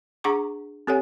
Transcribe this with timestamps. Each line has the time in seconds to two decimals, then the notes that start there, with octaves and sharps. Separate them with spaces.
0.24 D4 G#4 F#5 A#5 C#6 D6
0.87 C4 G4 A4 C#5 F#5 G#5